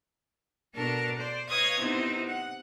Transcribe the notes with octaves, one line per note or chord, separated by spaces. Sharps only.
B2 D4 A4 A#4 A5
C5 D5
B4 C#5 D#5 F5 D#6 G#6
C3 B3 C4 D#4 E4
F#5